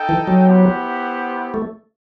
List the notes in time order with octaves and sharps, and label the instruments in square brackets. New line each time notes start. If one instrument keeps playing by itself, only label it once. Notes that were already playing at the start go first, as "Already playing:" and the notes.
Already playing: [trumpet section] D#4 A4 D#5 G5
[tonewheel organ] E3
F#3
[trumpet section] B3 E4 G4 C5 F#5
[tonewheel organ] A3